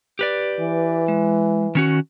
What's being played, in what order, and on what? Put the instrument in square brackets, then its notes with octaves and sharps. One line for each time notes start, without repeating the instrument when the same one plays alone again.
[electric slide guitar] G4 B4 D5
[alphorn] E3
[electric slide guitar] G#3
D#3 C#4 F#4